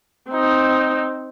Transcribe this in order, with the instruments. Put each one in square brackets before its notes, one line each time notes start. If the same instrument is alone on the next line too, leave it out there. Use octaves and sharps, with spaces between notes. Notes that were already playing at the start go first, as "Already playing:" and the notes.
[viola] C4 D#4